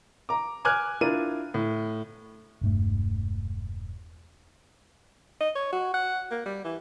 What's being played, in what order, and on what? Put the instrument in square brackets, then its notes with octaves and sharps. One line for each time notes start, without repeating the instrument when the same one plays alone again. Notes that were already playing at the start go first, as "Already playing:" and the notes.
[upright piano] A#5 D6
G#5 D6 F6 F#6 G#6
D4 E4 F4 A#4 D#7
A2
[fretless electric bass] E1 G2 A3
[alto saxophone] D#5
C#5
F#4
F#5
A#3
G3
E3